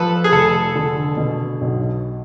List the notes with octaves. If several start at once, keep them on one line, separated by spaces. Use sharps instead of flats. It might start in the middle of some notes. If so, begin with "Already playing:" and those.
Already playing: F3 A4 B4
G#4
F1 A4
D3
B2
B1